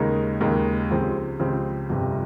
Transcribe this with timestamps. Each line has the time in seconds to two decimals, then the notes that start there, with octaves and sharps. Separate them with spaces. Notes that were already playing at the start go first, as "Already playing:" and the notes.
Already playing: D#2 C#3 G#3 D#4 A#4
0.40 D#2 C#3 G#3 D#4 A#4
0.89 C#2 C#3 F3 C4 G4
1.40 C#2 C#3 F3 C4 G4
1.89 G1 F2 C3 G3